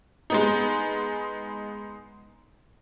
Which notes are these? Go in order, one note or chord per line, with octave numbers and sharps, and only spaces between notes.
G#3 B3 D#4